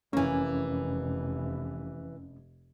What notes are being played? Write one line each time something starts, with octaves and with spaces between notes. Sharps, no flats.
F1 F2 E3 A#3 C#4